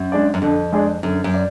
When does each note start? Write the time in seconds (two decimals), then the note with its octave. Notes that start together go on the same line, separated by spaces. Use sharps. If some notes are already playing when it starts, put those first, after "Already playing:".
Already playing: F#2
0.12 G#3 D4 G#4 D5
0.34 F#2
0.42 F2 D3
0.72 G#3 D4 G#4 D5
1.03 F#2 D3
1.24 F#2
1.34 D5